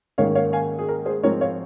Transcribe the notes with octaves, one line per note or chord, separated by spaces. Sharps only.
G#2 D#3 A#3 C#4 C#5 F5
C#5 F5
F5 G#5
G#4
A#4
G#4 C5
G#2 F3 C4 A#4 C#5
C#5 F5